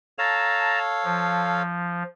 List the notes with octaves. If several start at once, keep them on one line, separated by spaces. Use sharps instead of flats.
A4 C#5 F5 A5 A#5
F3